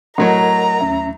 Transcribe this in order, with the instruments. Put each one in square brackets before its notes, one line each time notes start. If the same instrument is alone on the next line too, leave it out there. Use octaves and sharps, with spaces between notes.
[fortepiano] A2 F#3 C#5 [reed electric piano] A#4 D#5 F#5 [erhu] A#5
[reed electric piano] D#2 C#4 E5